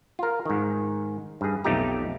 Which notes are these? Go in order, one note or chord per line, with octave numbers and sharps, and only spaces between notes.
F4 A#4
G#2 D#3
G2 G#4
B1 F2 A3 D#4 G4 A#5